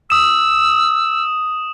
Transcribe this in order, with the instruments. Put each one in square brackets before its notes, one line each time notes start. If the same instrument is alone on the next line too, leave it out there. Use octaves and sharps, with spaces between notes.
[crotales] D#6 E7 [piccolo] E6